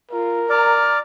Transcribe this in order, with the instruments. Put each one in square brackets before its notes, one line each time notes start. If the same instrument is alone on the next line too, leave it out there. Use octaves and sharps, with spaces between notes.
[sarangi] F4 [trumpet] A#4
[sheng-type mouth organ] D5 [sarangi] A#5 [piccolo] F6